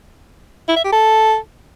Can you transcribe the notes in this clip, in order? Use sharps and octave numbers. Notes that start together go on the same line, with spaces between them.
E4
E5
G4
A4